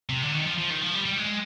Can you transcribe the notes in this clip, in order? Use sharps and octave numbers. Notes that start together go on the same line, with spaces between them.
C3
D3
D#3
F3
F3
D#3
F3
G3
G3
G#3